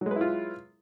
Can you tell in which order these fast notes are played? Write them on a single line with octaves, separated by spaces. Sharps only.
F#3 G#3 B4 E4 F4